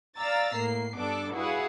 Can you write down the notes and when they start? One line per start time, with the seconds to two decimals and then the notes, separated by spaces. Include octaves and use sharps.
0.19 D5 F5 A#5 E6 A6
0.55 A2 A#3 C7
0.97 G2 B3 D4 A4 D6
1.33 E4 F#4 G#4 B4 F5 F#5